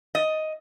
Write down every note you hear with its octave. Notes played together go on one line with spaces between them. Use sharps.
D#5